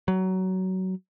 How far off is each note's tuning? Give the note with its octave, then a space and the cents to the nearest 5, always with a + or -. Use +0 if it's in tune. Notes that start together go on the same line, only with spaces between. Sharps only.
F#3 +20